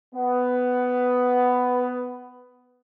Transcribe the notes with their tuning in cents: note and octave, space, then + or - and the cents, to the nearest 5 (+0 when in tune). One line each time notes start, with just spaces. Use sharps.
B3 +10